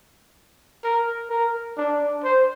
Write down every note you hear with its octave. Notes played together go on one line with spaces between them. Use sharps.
A#4
A#4
D4
C5